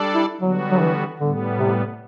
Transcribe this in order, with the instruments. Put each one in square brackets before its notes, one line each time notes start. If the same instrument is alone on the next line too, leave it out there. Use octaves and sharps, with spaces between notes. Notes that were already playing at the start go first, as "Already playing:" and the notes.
Already playing: [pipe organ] G3 D4 A4 D5
[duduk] E4
[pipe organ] D3 G3 B3 F#4 [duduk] F#3
[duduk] F#3
E3
[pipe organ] A2 G3 B3 [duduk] D3
[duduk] C3